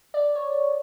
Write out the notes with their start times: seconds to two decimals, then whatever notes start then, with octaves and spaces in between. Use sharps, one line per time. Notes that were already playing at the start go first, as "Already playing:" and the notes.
0.14 D5
0.35 C#5